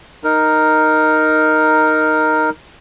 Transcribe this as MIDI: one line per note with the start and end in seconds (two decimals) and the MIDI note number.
0.24 2.50 63
0.24 2.50 70